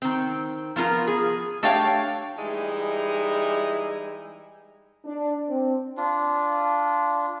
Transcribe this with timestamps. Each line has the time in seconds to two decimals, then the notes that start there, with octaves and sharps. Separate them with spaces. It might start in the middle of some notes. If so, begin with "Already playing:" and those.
0.02 D#3 C4
0.76 F3 B3 F4 A#4
1.07 G#4
1.63 A3 D4 G4 C#5 F5 G5
2.38 E3 G3 G#3 D#4 E4
5.05 D4
5.49 C4
5.97 D4 F4